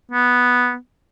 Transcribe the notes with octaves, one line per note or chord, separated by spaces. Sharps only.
B3